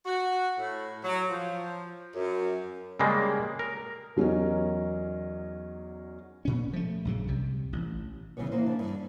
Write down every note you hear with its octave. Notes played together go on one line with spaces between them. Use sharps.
F#4
A2
F#3
F3
F#2
C#3 G3 G#3 A#3
A#4
E2 F#3 C#4 D#4 A#4
A#2 C#4
F3 A3
A#1 F#2 C#3
C2 C3
A1
C#3 E3 G3 B3 C#5
E3 A#3 C5
F2 C#3 D4 F5
G2
G3